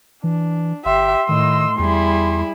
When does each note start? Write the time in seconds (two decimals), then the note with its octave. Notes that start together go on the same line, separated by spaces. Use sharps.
0.24 E3 D4
0.85 G1 G4 E5 C6
1.29 A2 D#3 D#5 E6
1.79 E2 G3 E4 G#4